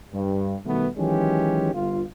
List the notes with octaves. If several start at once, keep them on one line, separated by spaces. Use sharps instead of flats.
G2
B2 D#3 G3 A3 B3
D#3 E3 F#3 G#3 C#4 G4
G1 F4